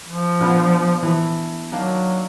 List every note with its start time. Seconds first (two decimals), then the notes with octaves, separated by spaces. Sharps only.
0.09 F3
0.40 A#2 D3 B3
1.03 E3 A3
1.72 D#3 F#3 A#3 D4